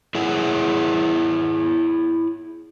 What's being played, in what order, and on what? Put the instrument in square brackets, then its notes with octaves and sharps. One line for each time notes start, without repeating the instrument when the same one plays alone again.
[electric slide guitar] E4 G#4 C#5 F#5